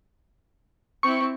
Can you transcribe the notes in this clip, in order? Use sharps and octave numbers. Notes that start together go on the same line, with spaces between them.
C4 E4 C#6